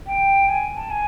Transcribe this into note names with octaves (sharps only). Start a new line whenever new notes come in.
G5
G#5
A5
G#5